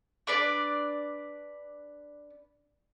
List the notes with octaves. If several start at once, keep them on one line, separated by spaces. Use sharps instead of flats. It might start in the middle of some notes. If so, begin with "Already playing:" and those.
D4 B4 D5